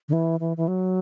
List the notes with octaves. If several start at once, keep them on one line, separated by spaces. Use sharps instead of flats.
D3
E3
E3
E3
F#3